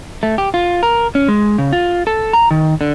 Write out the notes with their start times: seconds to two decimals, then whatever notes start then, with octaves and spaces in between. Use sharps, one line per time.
0.23 A3
0.38 G4
0.54 F4
0.83 A#4
1.15 C#4
1.28 G#3
1.58 C#3
1.73 F4
2.07 A4
2.33 A#5
2.51 D#3
2.81 D3